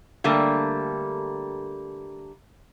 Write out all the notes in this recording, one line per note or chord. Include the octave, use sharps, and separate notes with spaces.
D3 G3 A3 A#3